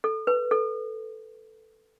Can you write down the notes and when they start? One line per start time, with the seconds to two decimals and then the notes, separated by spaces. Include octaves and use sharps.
0.04 A4
0.27 B4
0.51 A4